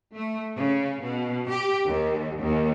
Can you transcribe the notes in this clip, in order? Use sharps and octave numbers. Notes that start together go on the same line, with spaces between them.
A3
C#3
B2
G4
D#2
D#2